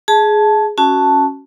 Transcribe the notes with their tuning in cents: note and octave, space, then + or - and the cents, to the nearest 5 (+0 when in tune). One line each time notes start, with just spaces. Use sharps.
G#4 +10 A5 -10
C#4 +0 F#4 +0 A5 +0